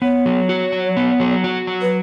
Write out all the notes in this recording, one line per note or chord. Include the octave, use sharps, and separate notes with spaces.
B3 C#5
F#3
F#4
F#3
B3
F#3
F#4
F#3
B4